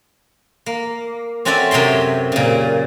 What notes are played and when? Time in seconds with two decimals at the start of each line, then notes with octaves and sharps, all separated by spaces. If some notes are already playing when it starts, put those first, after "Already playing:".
0.66 A#3
1.45 C4 C#4 F#4 A4 D5 E5
1.71 F#2 C3 F#3 G5 C6
2.32 A#2 C#3